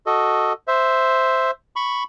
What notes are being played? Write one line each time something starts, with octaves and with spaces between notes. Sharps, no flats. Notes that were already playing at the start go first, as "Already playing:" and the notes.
F#4 A4 D#5
C5 E5
B5 C#6